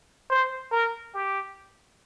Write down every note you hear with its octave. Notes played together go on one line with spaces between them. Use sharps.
C5
A#4
G4